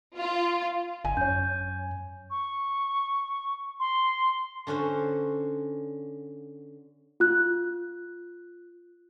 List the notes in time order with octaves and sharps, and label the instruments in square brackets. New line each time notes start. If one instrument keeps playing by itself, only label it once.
[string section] F4
[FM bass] G1 [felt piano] G#5
[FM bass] F#2 [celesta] C#5 G6
[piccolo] C#6
C6
[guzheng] D3 C#4 F#4 C5
[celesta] F4 F#6